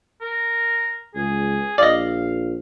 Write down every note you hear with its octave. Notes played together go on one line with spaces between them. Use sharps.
A#4
C#2 G#4
A#1 D5 D#5 F5